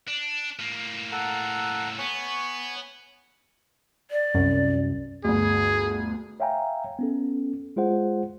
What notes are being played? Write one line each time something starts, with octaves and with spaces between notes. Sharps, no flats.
D4
A2 A#3
A4 F#5 A#5
B3 C#5 G#5 C#6
D5
C2 F#2
G1 D2 G#4
C#5 E5 F5 G5 G#5 A#5
B3 C#4 A4
G#3 F4 G#4 C5 F#5